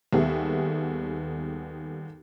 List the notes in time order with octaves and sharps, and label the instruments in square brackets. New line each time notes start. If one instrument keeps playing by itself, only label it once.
[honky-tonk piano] D#2 G3 B3 G#4 A4 E5